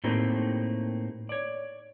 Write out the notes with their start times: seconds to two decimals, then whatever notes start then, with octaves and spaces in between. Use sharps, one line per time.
0.04 A2 A3 A#3 C4 D#4 G4
1.29 C#5 D5